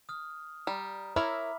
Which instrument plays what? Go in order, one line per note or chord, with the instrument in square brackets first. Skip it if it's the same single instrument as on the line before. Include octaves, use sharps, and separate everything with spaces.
[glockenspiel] D#6 F6
[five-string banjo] G3 [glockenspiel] A#5
[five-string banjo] E4 A#4 C#5 [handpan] E5 [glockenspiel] B5 D6 F6